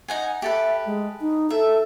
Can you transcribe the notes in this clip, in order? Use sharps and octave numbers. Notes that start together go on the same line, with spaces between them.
D#4 F#5 G#5
G4 A4 B4 E5
G#3
D#4
A4 E5